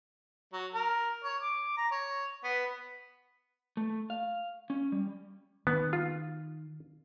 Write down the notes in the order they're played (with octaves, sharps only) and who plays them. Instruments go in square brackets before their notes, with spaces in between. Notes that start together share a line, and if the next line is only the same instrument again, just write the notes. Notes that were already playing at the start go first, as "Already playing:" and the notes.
[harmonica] F#3
A#4
C#5
D6
A#5
C#5
B3
[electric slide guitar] A3
F5
C#4
G3
[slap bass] D#3 [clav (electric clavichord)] B3
[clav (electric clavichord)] F4